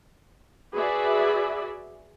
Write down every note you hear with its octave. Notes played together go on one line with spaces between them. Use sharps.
F#4 G#4 B4 D5 E5